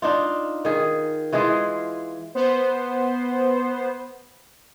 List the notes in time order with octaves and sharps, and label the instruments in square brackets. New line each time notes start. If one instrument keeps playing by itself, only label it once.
[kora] D4 D#4 F4
D#3 G#4
E3 G#3 F4 G#4
[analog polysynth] B3 C5